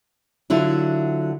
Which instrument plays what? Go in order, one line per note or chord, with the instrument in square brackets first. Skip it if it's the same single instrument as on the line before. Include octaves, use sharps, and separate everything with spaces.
[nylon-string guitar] D3 F#3 E4 F4